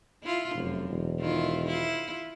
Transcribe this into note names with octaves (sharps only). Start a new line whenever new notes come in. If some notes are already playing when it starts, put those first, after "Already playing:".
E4 F4
F1 F#2
E1
D#3 E4 F4
E4 F4